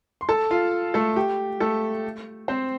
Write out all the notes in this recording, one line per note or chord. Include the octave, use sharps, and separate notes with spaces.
C6
A4 A5
F4 F5
A3 A4
G4
A3 A4
C4 C5